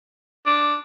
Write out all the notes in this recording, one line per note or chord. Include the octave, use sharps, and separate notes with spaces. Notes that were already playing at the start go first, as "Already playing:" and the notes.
D4